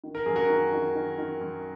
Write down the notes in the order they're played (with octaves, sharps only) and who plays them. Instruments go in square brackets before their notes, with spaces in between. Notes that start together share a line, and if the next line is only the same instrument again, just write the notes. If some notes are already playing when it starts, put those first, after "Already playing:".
[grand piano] D#3
A#4
F#2 G#4
F#4 A#4
D#3
D#3
D#3
D#3
F#2